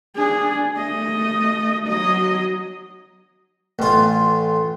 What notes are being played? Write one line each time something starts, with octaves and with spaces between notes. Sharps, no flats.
D4 G#4
A3 D#5
F#3 D#5
A1 F4